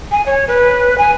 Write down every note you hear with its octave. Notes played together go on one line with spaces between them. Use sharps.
G#5
C#5
B4
G#5